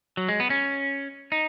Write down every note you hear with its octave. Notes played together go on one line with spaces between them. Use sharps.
F#3
G#3
B3
C#4
D#4